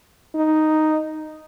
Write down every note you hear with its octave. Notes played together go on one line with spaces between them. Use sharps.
D#4